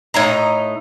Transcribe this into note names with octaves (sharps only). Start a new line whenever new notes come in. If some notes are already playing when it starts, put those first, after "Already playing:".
A2 D#4 A#5